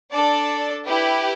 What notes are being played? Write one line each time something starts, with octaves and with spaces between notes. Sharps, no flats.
D4 A4 D5 A5
E4 G4 B4